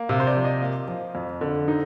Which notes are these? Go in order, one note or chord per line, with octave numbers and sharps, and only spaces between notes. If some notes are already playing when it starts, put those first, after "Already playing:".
Already playing: A#3
C3 F5
C5
D5
F3
D#5
A#3 F5
F3
F2
D3
D#4